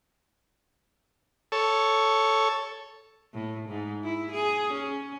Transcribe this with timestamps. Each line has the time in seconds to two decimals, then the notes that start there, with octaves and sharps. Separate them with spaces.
1.52 A4 C#5
3.34 A2
3.69 G#2
4.04 E4
4.32 G#4
4.73 C#4